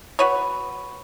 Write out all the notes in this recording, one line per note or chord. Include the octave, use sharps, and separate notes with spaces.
F#4 B4 C#5